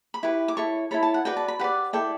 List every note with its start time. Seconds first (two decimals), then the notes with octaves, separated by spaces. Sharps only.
0.14 B5
0.23 E4 G4 B4 C#6
0.48 D6
0.57 E4 A4 C#5 C#6
0.91 E4 A4 C#5 B5
1.03 A5
1.14 F#5
1.25 F#4 B4 D5 G5
1.37 A5
1.48 B5
1.59 G4 B4 D5 F#5
1.93 E4 A4 D5 G5